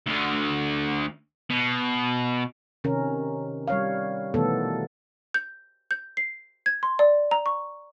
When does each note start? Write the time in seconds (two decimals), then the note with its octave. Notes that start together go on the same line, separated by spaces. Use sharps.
0.06 D2 D3
1.50 B2
2.84 C3 D#3 C#4 A#4
3.68 G3 C#5 F5
4.34 B2 D#3 E3 A3 B3 A4
5.34 G6
5.91 G6
6.17 C7
6.66 G#6
6.83 C6
6.99 D5
7.31 A#5
7.46 C#6